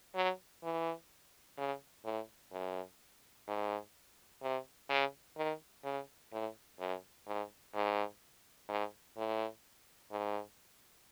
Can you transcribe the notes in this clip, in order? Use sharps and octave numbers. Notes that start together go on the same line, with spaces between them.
F#3
E3
C#3
A2
F#2
G#2
C3
C#3
D#3
C#3
A2
F#2
G#2
G#2
G#2
A2
G#2